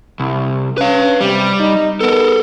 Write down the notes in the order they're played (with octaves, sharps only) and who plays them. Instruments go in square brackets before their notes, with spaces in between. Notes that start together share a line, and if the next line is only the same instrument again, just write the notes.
[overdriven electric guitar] C2
[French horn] C#4 [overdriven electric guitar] B4 F5
[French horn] C3 [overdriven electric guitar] G3
[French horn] D#4
[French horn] B3 [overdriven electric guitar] A4 A#4